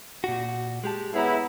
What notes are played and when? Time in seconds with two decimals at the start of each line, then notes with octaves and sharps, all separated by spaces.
0.24 A#2 F#4
0.84 G#3 G4 A5
1.14 B3 E4 G#4 C#5 A#5